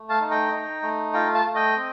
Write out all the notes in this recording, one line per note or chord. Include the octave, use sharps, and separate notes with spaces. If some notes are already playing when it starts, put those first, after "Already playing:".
Already playing: A3
F5 A5
D#4
G5 A#5
D#4
A3
F4 G5 A#5
F5 A5
A3
D#5 G5
C4